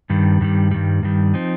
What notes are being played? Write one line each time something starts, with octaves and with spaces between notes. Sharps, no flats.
G2 D#3 G3
G2 D#3 G3
G2 D#3 G3
G2 D#3 G3
F3 C4 D#4